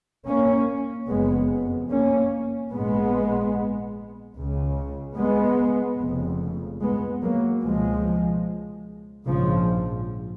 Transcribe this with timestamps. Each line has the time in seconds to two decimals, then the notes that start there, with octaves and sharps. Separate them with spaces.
0.27 A#3 C#4
1.09 F#1 F2 C#3 G#3 B3
1.91 A#3 C#4
2.73 A#1 G#2 G#3 B3
4.36 C#2 C#3
5.18 G#3 B3
6.00 F1 F2 C#3
6.82 G#3 B3
7.23 F#3 A#3
7.64 C#2 B2 F3 G#3
9.27 A#1 G#2 C#3 F3